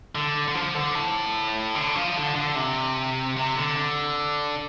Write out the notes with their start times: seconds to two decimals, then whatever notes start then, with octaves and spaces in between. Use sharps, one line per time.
0.15 D3
0.48 D3
0.55 F3
0.75 D3
0.95 A2
1.75 D3
1.95 F3
2.16 D3
2.36 D3
2.55 C3
3.37 C3
3.56 D3